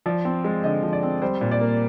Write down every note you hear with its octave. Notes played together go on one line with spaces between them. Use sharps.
F3 D5
C4
G#3
D3 D#5
F3
D5
C4
G3 C5
A#2
D5
A#3